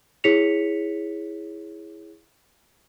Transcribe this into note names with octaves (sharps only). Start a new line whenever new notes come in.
E4 G#4 C#5 B6 C#7 F7